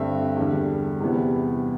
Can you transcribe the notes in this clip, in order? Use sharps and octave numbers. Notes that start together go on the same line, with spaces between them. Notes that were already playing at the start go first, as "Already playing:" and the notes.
Already playing: G2 D3 A3 C4 E5
E2 D3 G3
E2 C3 E3 G3 B3